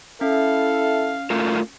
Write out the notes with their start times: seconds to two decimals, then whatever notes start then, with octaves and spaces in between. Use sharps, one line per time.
0.21 C#4 E4 A4 E5 F5
1.30 A3 F4 A#4